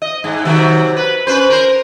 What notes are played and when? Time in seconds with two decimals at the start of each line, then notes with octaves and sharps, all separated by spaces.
0.02 D#5
0.24 G#2 G#3
0.45 C3 D#3 F#3
0.97 B4
1.27 C#4 B4 C5
1.50 A#4 C5